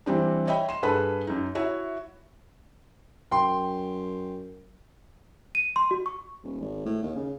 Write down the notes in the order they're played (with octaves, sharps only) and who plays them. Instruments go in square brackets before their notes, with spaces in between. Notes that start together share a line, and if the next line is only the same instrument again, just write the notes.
[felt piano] E3 G3 C4 D4
C#5 D#5 E5 G5 B5
C6 E7
G2 G#4 A4 B4 B5
F#2 D#4
E4 F#4 C#5 E5
[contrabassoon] F#2 [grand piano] G5 C6
[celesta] D#7
C6
F#4
C#6
[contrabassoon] D#1
G#1
A2
D#2
C#3